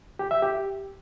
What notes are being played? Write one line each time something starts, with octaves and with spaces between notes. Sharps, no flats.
G4
E5
G4